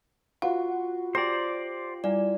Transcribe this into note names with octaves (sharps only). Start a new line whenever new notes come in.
F4 F#4 B4 F5 F#5
G4 A#4 C5 D5 A#6
G3 E4 D5 G#5